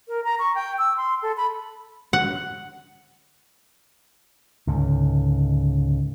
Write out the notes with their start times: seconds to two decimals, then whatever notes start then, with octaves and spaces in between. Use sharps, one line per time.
0.08 A#4
0.25 A#5
0.39 C#6
0.55 G5
0.78 E6
0.97 C6
1.22 A4
1.37 B5
2.13 F#5
4.67 C#2 G#2 D3